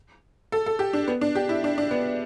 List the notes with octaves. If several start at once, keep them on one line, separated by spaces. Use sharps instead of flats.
A4
A4
G4
D4
B3
D4
G4
E4
D4
D4
B3